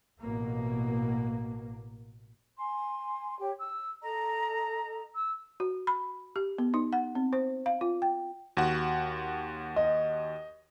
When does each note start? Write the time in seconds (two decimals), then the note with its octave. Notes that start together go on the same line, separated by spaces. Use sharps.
0.21 A1 B2 A#3
2.58 G#5 C6
3.39 G4 C#5
3.58 E6
4.02 A4 D#5 A#5
5.15 E6
5.60 F#4
5.87 B5
6.36 G4
6.58 B3
6.74 D#4
6.93 F#5
7.15 C4
7.33 C5
7.66 F5
7.81 F4
8.02 G5
8.57 D#2 F#4 F#5
9.76 D#5